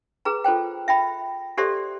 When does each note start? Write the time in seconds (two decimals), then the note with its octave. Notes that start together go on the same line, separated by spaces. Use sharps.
0.25 G#4 B4 A#5
0.44 F4 A4 C5 G5
0.88 E5 G5 B5
1.57 G4 A4 C5 D5 E5 C6